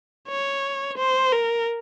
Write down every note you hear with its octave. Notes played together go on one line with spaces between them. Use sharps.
C#5
C5
A#4